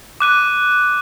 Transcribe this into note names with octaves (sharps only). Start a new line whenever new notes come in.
D6 F#6 D#7